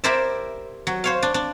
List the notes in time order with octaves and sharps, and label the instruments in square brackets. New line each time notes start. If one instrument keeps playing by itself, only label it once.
[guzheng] E4 G4 A#4 C5 D5 E5
F#3
C5 C#5 F5
D4
D4